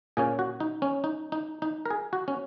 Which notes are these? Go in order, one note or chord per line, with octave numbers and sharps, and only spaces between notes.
A#2 A#3 C#4 G#4
F#4
D#4
C#4
D#4
D#4
D#4
A#4
G#4
F#4
C#4